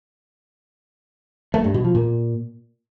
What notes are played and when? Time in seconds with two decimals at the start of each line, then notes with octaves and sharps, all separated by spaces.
1.54 A3
1.64 G2
1.74 B2
1.84 F3
1.95 A#2